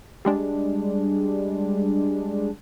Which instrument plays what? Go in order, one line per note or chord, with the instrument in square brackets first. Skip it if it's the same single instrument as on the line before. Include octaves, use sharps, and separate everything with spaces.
[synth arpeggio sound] G3 G#3 D4